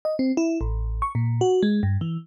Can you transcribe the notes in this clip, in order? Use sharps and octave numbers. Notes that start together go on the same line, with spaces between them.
D#5
C4
E4
A1
C#6
A#2
F#4
G#3
G2
E3